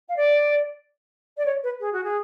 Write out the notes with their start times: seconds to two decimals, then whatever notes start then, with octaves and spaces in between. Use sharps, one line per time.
0.08 F5
0.16 D5
1.37 D5
1.45 C#5
1.63 B4
1.80 G#4
1.92 F#4
2.03 G#4